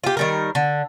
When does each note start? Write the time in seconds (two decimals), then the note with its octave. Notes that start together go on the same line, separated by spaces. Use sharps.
0.04 F4 G4
0.17 D#3 G3 A#4
0.55 D3